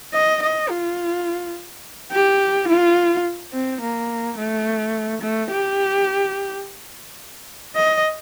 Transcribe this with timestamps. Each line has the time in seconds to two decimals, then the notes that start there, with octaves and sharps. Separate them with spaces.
0.13 D#5
0.42 D#5
0.70 F4
2.11 G4
2.68 F4
3.52 C4
3.81 A#3
4.37 A3
5.22 A3
5.50 G4
7.75 D#5